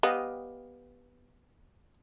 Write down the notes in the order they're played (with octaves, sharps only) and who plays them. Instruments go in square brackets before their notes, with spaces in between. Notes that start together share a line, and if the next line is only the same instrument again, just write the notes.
[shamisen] B3 [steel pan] G4 D#5 F5